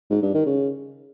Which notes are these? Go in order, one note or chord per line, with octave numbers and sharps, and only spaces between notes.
G#2
G2
D#3
C#3